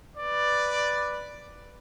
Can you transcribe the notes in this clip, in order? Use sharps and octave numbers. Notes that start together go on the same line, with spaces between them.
B4 D5